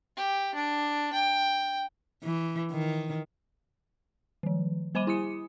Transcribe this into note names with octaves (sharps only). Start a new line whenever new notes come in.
G4
D4
G5
E3
D#3
D#3 F3
G3 C5 G#5 B5 D6 D#7
E4 G#5 D#6 C#7